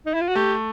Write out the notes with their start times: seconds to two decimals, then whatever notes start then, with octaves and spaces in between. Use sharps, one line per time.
0.06 D#4
0.14 E4
0.21 F4
0.28 F#4
0.35 A3 G4